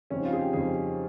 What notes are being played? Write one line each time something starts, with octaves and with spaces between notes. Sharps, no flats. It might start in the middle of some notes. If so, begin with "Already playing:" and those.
F2 C#3 G3 C4 C#4 D#4
F4
G#4
G4
F2 C#3 G3 C4 D#4 G#4